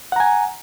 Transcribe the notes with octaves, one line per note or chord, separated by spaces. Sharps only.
F#5 G#5 A#5